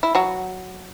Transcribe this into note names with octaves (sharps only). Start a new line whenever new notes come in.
E4
F#3 F#4